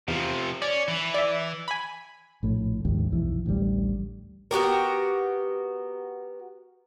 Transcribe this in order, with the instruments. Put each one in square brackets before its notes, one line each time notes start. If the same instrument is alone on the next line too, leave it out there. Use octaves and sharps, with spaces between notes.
[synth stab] E2 [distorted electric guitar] C3 F3
[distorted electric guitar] C#4 [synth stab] D5
[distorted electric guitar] E3
[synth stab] D5 E5
G#5 B5
[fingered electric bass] A#1 A2
A#1 D#2 G#2
B1 F2 E3
A1 D2 D#3 G3
[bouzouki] B3 F#4 G4 A#4